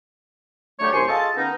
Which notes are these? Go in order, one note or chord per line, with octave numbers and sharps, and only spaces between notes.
D3 F#3 A3 D4 G4 C#5
C2 F#2 C5 G#5 C6 C#6
F4 G#4 A4 D#5 A5
D#3 B3 C#4 D#4